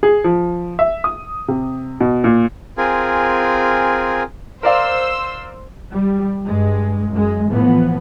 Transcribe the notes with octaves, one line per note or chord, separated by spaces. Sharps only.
G#4
F3
E5
D#6
C3
B2
A#2
C4 F4 G#4 A#4 G#5
A#4 C5 D5 F5 C6 E6
G3
G2 G#3
F#2 G#3
A2 E3 F3 B3